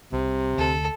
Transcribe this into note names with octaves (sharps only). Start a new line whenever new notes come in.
C2 C3
D2 A4